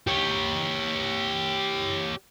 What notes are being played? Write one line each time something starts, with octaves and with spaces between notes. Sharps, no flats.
G4 C#5